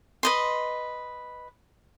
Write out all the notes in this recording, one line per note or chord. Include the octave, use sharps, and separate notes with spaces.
B4 D#5 C6